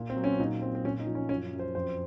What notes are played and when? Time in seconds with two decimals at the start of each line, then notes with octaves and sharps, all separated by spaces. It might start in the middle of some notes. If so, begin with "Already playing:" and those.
Already playing: A#2
0.10 C4
0.16 F#3
0.24 C#4
0.39 A#2 D#4
0.61 F#3 C4
0.75 C4
0.85 A#2 C#4
0.99 D#4
1.07 F3
1.15 C#4
1.29 F#2 C#4
1.53 F#2
1.59 C5
1.75 F2 C5